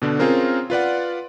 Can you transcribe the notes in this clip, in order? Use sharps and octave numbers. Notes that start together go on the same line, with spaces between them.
B2 D3 D4
C4 C#4 F4 G#4 A#4 C5
F4 B4 D5 F#5